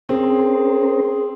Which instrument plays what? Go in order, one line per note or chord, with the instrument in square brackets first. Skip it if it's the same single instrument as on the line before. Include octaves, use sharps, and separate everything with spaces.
[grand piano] C4 [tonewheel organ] C#4 A#4 C5 [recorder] G#4